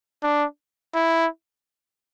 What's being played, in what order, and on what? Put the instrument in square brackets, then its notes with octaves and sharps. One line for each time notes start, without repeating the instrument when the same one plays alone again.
[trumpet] D4
E4